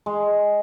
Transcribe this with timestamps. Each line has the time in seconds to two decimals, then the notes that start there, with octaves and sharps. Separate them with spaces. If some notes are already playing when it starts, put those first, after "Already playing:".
0.06 G#3